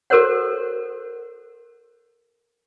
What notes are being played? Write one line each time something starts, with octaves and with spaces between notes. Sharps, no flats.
F#4 A4 A#4 C5 C#5 F#5